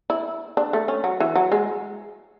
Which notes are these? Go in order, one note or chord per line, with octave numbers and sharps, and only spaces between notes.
E4
D4
A3
C#4
F#3
E3
F#3
G#3